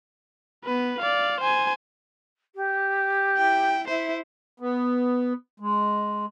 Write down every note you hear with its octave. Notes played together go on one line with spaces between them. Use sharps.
B3 B4
D5 F5
C5 G#5
G4
E4 G5
E4 C5 E5
B3
G#3